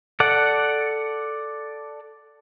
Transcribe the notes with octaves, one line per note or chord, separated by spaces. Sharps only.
A4 D5 F#5